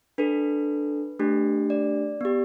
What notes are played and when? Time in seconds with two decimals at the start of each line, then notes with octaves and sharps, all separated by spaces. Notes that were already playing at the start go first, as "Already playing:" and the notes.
0.18 D4 A4 B4
1.19 A3 D4 G4
1.70 D5
2.21 B3 G4